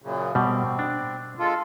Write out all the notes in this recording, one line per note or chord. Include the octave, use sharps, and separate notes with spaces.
F#2 A#2 C#3
B2 G3 C4
D4
G#3 F4 A4